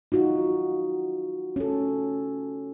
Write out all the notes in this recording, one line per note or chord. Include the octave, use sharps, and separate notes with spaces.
D#4 F4 F#4
C#4 A4